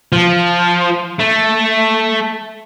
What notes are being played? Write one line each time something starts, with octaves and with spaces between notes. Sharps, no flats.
F3
A3